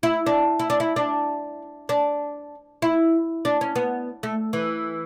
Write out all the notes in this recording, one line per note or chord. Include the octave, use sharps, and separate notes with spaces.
E4
D4
E4
D4
E4
D4
D4
E4
D4
C#4
B3
A3
E3